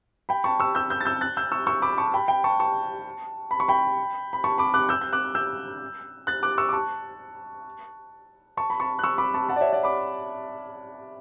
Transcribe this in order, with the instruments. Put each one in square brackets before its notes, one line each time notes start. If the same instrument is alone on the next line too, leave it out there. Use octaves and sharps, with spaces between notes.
[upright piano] G5 B5
A5 C#6
C#6 E6
E6 G6
E6 G6
A6
E6 G6
F#6 A6
E6 G6
C#6 E6
C#6 E6
B5 D6
A5 C#6
G5 B5
G5 B5
A5 C#6
A5 C#6
B5
C#6
G5 B5
B5
A5 C#6
B5 D6
D6 F#6
E6 G6
G6
D6 F#6
E6 G6
F#6 A6
D6 F#6
C#6 E6
D6
A5 C#6
A5 C#6
B5
A5 C#6
F#6
C#6 E6
B5 D6
A5 C#6
F#5 A5
D5
C#5 E5
D5 F#5
B5 D6